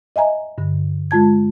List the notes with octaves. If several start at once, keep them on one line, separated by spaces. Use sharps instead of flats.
D#5 E5 G#5 A#5
G2 D3
G#3 F4 A5 G#6